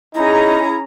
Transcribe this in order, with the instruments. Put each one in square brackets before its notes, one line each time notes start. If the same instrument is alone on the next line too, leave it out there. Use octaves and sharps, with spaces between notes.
[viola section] C#4 G#4 A#5 [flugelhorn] D#4 [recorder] E4